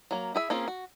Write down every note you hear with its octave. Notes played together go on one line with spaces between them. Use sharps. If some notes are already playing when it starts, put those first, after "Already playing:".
F#3 A#3
E4 G#4 E5
A#3 C4 C#4 F4 G#4
F#4